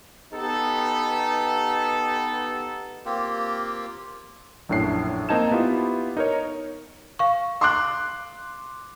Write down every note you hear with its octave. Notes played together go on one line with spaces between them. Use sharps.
B3 D#4 G4 A4
A#3 C4 F4 G4
A#1 F#2 A2 D4 C7
A#3 C4 D#4 A5 G#6 E7
B3 E4 F4 G4
D#4 A#4 C#5
F5 C#6
C6 D6 F#6